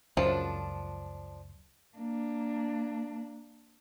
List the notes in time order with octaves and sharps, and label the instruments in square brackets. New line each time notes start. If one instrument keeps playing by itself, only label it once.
[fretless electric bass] C#2 F#2 [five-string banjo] F3 D4
[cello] A#3 D4